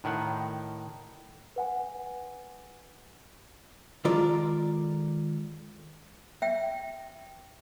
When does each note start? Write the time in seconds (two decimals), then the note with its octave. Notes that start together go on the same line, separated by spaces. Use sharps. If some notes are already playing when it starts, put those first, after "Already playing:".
0.04 A2 D#3 F#5
1.56 B4 F#5 G#5
4.05 D#3 G#3 F4 A4 A#4 D5
6.42 E5 G5